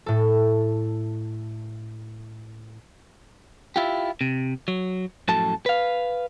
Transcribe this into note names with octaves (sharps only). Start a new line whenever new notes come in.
A2 A4
E4 F4 G4
C3
F#3
F#2 A2 F3 F#4 A4 A5
B4 F5